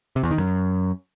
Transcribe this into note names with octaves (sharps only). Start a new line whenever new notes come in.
C3
E2
D#3
F#2